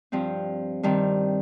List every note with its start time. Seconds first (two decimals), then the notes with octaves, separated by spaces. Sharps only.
0.12 G2 F3 C4
0.83 G2 D#3 G3 C4